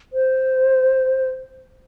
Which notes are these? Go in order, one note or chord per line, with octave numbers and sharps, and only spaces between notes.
C5